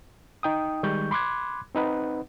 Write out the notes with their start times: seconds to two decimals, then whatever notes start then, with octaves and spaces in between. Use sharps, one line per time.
0.43 D#4 G5 D#6
0.83 D#3 G3 G#3 C#6 G6
1.11 B5 C6 D6 F#6 G#6
1.75 C4 D#4 B4 F#5